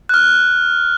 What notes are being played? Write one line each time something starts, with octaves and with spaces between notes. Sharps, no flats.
F6 F#6